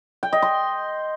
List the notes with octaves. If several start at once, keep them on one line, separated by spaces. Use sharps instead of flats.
G5
D#5
C6